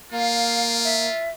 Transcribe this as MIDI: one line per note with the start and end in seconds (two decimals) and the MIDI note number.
0.12 1.08 58
0.12 1.33 65
0.12 0.79 77
0.84 1.30 76